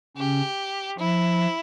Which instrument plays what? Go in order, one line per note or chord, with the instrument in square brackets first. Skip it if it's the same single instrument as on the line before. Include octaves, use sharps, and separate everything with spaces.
[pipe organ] C#3 C#4 [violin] G4
[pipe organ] F3 [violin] E4